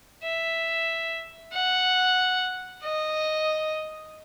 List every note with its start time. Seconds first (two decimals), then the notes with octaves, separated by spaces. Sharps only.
0.23 E5
1.53 F#5
2.83 D#5